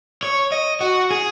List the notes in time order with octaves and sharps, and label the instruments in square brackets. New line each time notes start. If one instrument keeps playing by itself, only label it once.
[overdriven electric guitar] C#5
D#5
F#4
G#4